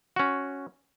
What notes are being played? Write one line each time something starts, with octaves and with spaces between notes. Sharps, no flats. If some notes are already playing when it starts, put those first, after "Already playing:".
C#4 F#4